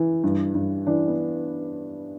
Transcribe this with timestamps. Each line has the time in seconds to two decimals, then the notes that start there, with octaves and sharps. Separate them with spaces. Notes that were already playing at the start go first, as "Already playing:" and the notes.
Already playing: E3
0.24 G2
0.55 G2
0.87 E3 D4
1.08 B3